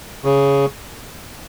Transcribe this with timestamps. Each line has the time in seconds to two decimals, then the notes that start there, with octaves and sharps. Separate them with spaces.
0.25 C#3